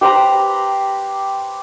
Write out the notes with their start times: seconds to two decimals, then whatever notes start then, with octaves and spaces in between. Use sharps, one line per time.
0.01 G4 B4 C5 A#5